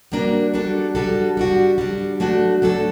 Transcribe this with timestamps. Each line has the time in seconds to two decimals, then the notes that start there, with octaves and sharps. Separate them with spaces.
0.12 G3 A#3 D4 F#4 A#4
0.54 G3 D4 F#4 A4
0.95 G3 D4 F#4 A4
1.37 G3 D4 F#4
1.78 G3 D4 F#4
2.20 F#3 A3 D4 F#4 A4
2.62 F#3 A3 D4 F#4 A4